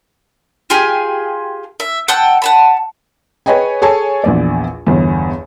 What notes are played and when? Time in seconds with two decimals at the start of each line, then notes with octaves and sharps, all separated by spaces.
0.70 F4 G4 G#4 G#5
1.80 E5
2.08 F#5 G5 A5 E6
2.42 F#5 A5 B5
3.46 G#4 B4 C#5 D#5 G5 G#5
3.82 G#4 A4 C#5 G#5 A5
4.24 A#1 E2 D5
4.87 G1 E2